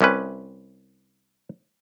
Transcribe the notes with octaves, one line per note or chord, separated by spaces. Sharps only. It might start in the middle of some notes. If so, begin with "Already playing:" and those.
C2 C3 C#4 B4